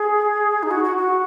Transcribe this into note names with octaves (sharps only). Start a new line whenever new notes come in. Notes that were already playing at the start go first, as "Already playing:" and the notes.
Already playing: G#4
D#4
F#4
F#4
F#4